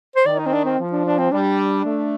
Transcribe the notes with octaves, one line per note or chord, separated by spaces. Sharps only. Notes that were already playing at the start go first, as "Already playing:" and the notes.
C5
D#3 D5
D#4
C4
D4
C4
F3
D4
D4
C4
G3 D4
A3